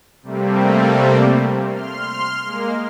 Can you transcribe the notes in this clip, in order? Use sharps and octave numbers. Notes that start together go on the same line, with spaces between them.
C3 G3 A3 A#3 C4
C6 F6
G#3 A#3